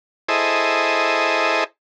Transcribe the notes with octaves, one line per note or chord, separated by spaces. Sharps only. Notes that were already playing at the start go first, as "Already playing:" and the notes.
E4 G#4 A4 C5 D#5